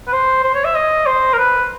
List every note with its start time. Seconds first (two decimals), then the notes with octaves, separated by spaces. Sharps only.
0.07 B4
0.12 C5
0.44 C5
0.55 C#5
0.65 E5
0.75 D#5
1.07 C5
1.34 A#4
1.38 B4